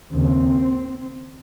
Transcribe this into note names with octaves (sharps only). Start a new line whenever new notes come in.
D#2 C#3 C4